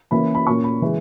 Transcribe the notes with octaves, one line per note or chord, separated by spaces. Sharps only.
E3 A#3 C#4 B5
B5
A#2 A#3 C#4 C#6
B5
E3 G#3